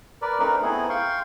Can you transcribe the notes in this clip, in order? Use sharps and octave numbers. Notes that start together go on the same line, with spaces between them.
A#4 B4 D5
A3 C4 D4 D#4 A#4 B4
A3 B3 C4 D#4 E4 G#4
F5 G5 C6 C#6